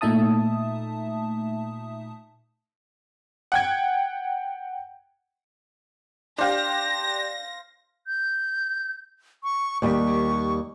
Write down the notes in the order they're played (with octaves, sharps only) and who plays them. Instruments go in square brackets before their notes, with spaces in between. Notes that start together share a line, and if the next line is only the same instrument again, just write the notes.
[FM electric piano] A#2 A3 D#4 E5 A5 D#6
[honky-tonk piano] F#5 G5 G#6
[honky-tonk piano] D4 G4 [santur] C5 F5 [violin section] A#6
[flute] G6
C#6
[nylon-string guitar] D#2 G3 [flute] C#6